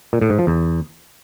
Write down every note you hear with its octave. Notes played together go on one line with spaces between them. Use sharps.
A#2
A2
G#2
F3
E2